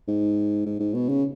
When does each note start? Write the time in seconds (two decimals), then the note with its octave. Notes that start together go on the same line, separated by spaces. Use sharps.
0.08 G#2
0.66 G#2
0.80 G#2
0.94 B2
1.09 C#3